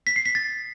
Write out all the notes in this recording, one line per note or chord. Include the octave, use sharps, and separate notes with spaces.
B6
C7
B6
A6